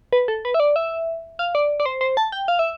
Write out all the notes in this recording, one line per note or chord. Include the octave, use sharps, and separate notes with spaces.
B4
A4
B4
E5
D5
E5
F5
D5
D5
C5
C5
A5
G5
F5
E5